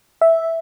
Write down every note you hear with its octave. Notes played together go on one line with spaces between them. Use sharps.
E5